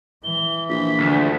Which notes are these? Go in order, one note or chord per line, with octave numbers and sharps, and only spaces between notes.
E3 G7
A#1 B6
D2